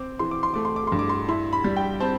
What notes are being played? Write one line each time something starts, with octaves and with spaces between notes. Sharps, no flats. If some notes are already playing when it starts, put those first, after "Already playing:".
Already playing: C4 D6
E3 C6
D6
C6
A3 D6
C6
D6
G2 C6
D6
C6
E4 C6
B5
G3
G5
C4 A5